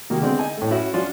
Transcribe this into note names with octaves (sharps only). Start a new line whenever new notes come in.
C3 D#3 A#3 F#4
D3 G#3 B3 C4
D#4 G#5
A2 A3
C#4 E4 F#4
F3 C#4 D4 F4 F#4